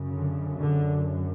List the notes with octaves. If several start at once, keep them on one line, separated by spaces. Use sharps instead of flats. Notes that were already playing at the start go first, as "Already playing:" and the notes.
Already playing: F#2 C#3
D3
D3